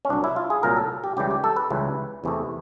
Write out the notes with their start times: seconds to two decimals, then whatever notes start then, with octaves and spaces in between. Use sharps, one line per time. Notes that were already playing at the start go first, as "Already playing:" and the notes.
0.05 C#4
0.09 C2 A#2 F#3 D4
0.24 E4
0.36 F4
0.50 G#4
0.63 C2 A#2 F#3 A#4
0.77 A4
1.04 G4
1.17 C#2 C#3 E3 G3 G4
1.31 G4
1.44 A4
1.56 B4
1.70 C#2 C#3 E3 G3
2.24 E2 C3 E3 A3